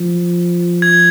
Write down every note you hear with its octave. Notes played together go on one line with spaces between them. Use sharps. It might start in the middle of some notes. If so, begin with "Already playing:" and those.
Already playing: F3
G#6